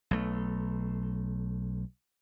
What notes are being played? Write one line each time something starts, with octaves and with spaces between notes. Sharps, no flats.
B1 A3